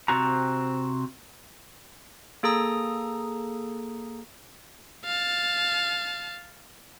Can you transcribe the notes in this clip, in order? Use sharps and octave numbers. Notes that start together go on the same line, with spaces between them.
C3 C4 F#4 A#5
A#3 G#4 A4 A#5 D#6
F5 A5